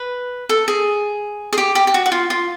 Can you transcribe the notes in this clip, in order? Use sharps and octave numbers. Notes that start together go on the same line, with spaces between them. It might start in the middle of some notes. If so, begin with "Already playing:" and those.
Already playing: B4
A4
G#4
G#4
G4
G4
G4
F#4
F#4
F4
F4